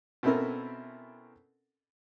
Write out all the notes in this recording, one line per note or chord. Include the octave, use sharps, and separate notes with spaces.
B2 C4 C#4 E4 A4 A#4